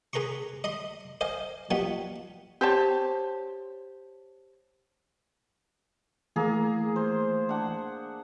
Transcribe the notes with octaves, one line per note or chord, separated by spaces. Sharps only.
G#4 B4 A#5 C6 C#6
D#5 B5 C6
C5 D#5 F5 G#5
F3 G3 B3 D#4 F#4
G4 C5 C#5 A5
E3 A3 A#3 G#4
C5
D4 F#5